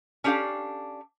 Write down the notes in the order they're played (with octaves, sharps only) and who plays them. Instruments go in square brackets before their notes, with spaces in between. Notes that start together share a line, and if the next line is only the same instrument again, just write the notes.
[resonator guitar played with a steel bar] C#4 D4 G4 A4 F5